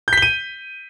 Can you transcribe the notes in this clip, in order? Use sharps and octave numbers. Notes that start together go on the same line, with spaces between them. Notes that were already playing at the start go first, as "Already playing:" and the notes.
G6 B6 D#7 G7